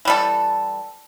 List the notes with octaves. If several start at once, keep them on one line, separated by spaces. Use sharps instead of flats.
E3 G3 A4